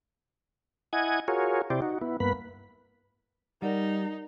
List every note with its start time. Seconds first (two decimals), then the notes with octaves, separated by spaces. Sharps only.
0.93 E4 D#5 F#5 G#5 G#6
1.28 F4 F#4 G#4 A#4 C#5
1.70 C3 E4 G4 C5 D5
1.82 D#4 F#4
2.01 B3 E4
2.20 G2 A#3 B3 B4 B5
3.62 G3 D#4 A#4 D5 F#5